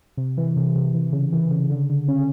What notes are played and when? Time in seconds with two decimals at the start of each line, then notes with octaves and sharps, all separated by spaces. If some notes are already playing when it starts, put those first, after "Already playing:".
0.17 C3
0.37 E3
0.56 C3
0.75 C3
0.94 E3
1.12 C#3
1.32 E3
1.51 C#3
1.70 D3
1.90 D3
2.08 C#4